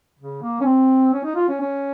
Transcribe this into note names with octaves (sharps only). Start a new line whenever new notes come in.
C#3
A#3
C#4
C4
C#4
D#4
F4
C#4
C#4